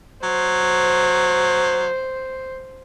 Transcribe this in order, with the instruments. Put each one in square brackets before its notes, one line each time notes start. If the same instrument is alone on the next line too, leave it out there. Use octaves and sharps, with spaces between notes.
[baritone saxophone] F#3 [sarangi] C5